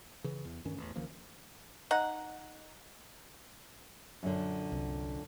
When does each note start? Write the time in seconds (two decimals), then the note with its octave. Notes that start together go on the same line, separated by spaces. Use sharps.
0.24 C#3 E3
0.45 E2
0.65 D2 G2 D#3 C#4
0.78 A1 E2
0.96 C#2 D#3 F3 A#3
1.91 D#4 F#5
4.23 F#2 A#2 D3
4.72 C2